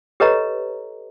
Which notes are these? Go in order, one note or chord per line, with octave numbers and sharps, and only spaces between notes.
G4 A4 B4 C#5 D#5 A#5